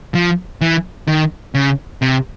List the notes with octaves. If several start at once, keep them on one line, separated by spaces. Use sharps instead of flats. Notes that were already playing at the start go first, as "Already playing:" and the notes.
F3
E3
D#3
C#3
C3